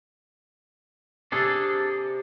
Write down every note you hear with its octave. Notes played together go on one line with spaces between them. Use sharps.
C3 D4 G#4 A4